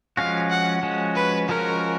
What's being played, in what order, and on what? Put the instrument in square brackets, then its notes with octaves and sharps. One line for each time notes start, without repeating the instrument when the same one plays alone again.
[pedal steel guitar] F3 G#3 C#4 F#4 [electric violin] F5
[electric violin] F#5
[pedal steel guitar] F3 G#3 C#4 F#4
[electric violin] B4
[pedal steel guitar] F3 G#3 C#4 F#4 [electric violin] A#4